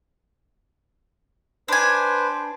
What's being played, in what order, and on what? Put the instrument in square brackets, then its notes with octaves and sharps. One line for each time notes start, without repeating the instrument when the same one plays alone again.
[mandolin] D4 G#5 [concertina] B4 C5